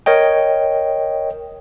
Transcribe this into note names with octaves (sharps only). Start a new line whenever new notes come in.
A#4 C#5 D#5 G5